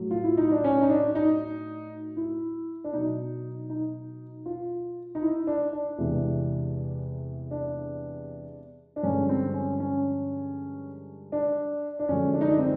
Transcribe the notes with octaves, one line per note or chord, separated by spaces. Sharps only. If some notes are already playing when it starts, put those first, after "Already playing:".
Already playing: A2 F#3
F4
E4
D#4
D4
C#4
D#4
D4
D#4
E4
D4
B2 F#3 D#4
D#4
F4
D#4
E4
D4
D4
E2 C3 E3 G#3
D4
D4
G2 D3 F3 G#3 C#4
C4
C#4
C#4
D4
D4
F#2 D3 F3 G#3 C#4
D4
D#4
D4
C4